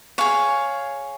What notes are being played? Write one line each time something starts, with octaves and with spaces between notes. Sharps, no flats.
G#4 C#5 F5